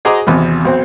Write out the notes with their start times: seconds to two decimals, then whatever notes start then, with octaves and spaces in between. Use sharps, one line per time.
0.05 F#4 G#4 C5 D#5 A#5 D6
0.27 G#1 E2 C3
0.65 B1 C4